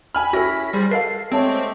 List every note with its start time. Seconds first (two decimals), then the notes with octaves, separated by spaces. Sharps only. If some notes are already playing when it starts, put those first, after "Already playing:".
0.15 G5 G#5 B5 F6
0.33 C#4 E4 F#4 A4 A#6 B6
0.73 G3 G#4 C5
0.91 A4 A#4 D#5 F5 C7
1.32 G#3 A3 C4 G4 C#5 A5